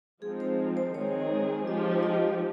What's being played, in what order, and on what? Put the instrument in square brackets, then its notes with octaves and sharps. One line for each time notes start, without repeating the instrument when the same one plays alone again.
[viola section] F3 G#3 C4 D#4 [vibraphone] G#4
[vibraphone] C5
C5
[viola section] D#3 G#3 C4 D#4 G#4 [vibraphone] C#5
[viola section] F3 G#3 D#4 G4 [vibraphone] D#5
[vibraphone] D#5